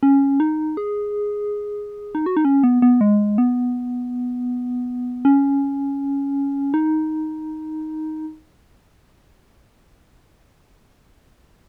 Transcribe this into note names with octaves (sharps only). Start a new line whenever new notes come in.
C#4
D#4
G#4
D#4
F#4
D#4
C#4
B3
B3
G#3
B3
C#4
D#4